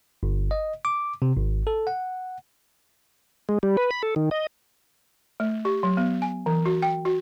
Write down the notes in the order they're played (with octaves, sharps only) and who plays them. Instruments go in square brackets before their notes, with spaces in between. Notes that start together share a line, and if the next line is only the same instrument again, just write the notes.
[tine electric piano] G1
D#5
D6
C3
G#1
A4
F#5
[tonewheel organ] G#3
G3
B4
B5
A4
D#3
D#5
[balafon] A3
G4
F#3
B3
G#5
E3
F#4
G5
F#4